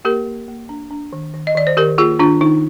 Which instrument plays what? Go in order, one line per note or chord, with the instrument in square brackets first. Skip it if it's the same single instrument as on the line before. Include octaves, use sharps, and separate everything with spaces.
[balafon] A#3 G4 A#4
A#3
A#3
D4
D4
D#3
D#3
D#5
D#3 D5
C5
D#3 G4 A#4
A#3 F4 G#4
D#3 D4 F4
D#3 D#4